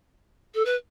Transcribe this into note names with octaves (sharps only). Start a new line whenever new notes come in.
A4
B4